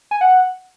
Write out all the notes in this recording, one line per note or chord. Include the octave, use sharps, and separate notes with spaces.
G#5
F#5